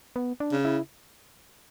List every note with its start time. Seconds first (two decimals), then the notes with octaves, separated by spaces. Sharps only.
0.16 B3
0.40 D4
0.52 C#3
0.65 E4